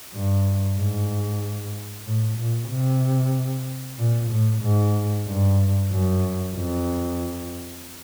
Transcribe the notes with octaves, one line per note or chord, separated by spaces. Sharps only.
G2
G#2
A2
A#2
C3
A#2
A2
G#2
G2
F#2
F2